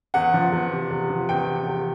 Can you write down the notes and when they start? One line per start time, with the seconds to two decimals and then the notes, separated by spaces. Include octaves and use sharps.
0.14 E2 F#5
0.34 F3
0.52 E2
0.72 C3
0.91 E2
1.10 F3
1.29 E2 G5
1.48 C3
1.67 E2